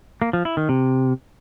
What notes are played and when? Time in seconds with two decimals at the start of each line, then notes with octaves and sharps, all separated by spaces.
0.22 A#3
0.33 F3
0.45 E4
0.57 D#3
0.69 C3